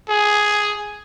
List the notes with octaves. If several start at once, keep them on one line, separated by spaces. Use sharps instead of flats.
G#4